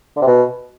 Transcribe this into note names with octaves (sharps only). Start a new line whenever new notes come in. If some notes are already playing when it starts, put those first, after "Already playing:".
D3
C3
B2